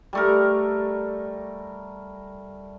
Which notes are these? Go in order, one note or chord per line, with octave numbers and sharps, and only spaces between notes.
G3 A3 A#4